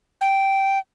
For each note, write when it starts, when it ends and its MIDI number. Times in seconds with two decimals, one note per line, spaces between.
0.21 0.79 79